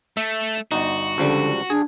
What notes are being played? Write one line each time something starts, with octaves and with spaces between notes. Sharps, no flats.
A3 E5
G1 D#4 F#4
C#2 D3 F3 G3
D4 G#4